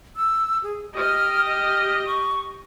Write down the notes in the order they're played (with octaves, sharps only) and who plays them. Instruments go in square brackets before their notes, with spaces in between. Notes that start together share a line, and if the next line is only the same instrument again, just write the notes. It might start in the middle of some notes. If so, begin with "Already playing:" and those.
[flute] E6
G#4
[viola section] G4 D#5 [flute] F6
[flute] F6
C#6